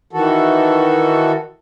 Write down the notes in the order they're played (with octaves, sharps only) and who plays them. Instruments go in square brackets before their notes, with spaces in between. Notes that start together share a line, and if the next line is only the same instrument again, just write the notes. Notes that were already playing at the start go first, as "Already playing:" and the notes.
[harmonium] D#3 E3 F#4 A4